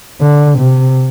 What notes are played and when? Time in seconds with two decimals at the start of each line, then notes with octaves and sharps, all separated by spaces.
0.21 D3
0.59 C3